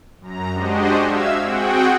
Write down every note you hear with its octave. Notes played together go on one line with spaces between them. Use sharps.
F#2 A#5
G#3 D4 F#4 G4 C5 D#5
E5 F5 E6 G#6
C4 F#4 G#4 F#5 G5